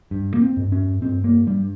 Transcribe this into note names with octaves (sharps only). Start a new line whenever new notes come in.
G2
A#3
C4
G2
C#4
G2 C4
A#3
G2 G3